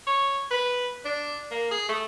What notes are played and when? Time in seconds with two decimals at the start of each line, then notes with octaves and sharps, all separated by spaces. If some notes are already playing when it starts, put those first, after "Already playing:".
0.07 C#5
0.51 B4
1.05 D4
1.51 A#3
1.71 G#4
1.89 A3